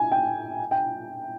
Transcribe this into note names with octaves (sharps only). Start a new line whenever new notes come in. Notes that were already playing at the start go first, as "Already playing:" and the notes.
Already playing: G#5
G5
G5